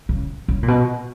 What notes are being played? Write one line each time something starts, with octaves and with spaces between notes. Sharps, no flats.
C#3
C#3
A#2
B2